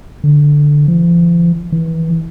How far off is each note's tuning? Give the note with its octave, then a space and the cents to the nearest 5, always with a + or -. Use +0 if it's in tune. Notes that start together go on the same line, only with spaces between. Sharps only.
D3 +0
F3 -40
E3 -20